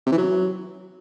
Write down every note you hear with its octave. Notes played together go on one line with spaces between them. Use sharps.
C3
E3
F#3